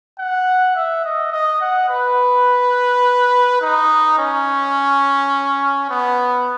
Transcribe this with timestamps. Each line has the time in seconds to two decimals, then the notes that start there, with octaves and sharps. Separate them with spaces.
0.19 F#5
0.76 E5
1.05 D#5
1.32 D#5
1.61 F#5
1.89 B4
3.62 D#4
4.18 C#4
5.90 B3